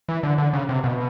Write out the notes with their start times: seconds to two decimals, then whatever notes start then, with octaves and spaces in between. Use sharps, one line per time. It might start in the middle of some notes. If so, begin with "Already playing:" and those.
0.09 E3
0.23 D3
0.38 D3
0.53 C#3
0.69 C3
0.84 B2